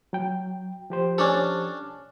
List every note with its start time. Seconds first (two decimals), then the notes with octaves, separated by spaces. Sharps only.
0.13 F#3 G5
0.90 F3 G4 C5
1.18 C#4 D4 A4